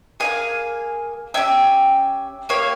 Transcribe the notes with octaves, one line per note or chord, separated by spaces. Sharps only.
A#3 F4 G#4 F5 G#5
C#4 G4 E5 G5
A#3 E4 G4 C#5 F5